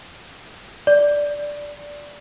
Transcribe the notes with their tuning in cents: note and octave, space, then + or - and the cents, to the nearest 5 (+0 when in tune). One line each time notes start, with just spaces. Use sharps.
D5 -5